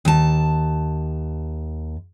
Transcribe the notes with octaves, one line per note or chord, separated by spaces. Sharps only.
D#2 A5